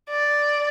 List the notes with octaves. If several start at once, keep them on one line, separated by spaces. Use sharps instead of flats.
D5